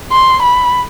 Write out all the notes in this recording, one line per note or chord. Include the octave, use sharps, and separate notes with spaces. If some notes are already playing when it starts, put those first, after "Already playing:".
C6
B5